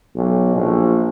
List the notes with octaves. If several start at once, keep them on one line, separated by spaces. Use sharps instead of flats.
B1
A#1